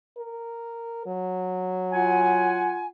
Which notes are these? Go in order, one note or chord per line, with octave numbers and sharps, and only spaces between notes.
A#4
F#3
F4 F#5 G#5